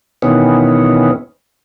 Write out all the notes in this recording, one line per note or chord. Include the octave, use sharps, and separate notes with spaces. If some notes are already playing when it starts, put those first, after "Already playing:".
B2 D#3 E3 B3 C#4